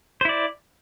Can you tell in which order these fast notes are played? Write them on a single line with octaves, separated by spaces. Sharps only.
C5 E4 D5